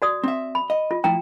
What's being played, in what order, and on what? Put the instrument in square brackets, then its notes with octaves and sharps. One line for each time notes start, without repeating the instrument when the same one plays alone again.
[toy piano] F#4 D5 D#6
[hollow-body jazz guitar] C4 E5
[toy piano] B5
[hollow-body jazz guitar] D#5
[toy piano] F4
[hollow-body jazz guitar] A2 F3 E4 [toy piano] G5 A#5